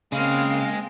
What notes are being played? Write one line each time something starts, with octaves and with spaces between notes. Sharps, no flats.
C#3 G#3 A#3 C4 F5